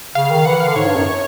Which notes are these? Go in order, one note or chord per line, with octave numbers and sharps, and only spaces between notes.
C#3 F5
D#3
E3 F#5
F5
D3
G#2 C#5
G2
F#2